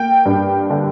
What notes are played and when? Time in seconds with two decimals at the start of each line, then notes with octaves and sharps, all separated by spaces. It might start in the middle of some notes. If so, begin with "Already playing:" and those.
Already playing: A#3 G5
0.25 G2
0.70 D3